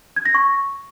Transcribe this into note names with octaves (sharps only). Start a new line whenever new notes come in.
G#6
A#6
C#6